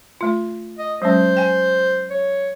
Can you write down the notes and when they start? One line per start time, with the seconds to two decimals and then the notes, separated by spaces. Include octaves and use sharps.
0.21 A3 F4
0.79 D#5
1.02 F#3 G#3 C#4 C5
1.37 G5 G#5
2.11 C#5